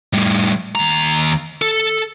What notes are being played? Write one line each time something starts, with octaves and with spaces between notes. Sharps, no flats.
A2 G3
D#2 A#5
A4